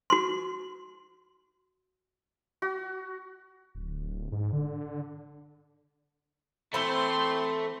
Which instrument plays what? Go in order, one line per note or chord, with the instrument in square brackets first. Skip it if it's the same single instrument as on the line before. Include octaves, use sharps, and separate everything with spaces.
[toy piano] F#4 C6
[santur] F#4
[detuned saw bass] D1
G#2
D3
[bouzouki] E3 C5 [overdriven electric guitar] A3 [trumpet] C4 [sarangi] C6